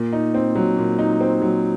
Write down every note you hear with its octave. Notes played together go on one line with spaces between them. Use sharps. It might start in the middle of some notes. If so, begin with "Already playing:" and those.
Already playing: A#2
D#4
C4
F#3
A#2
D#4
C4
F#3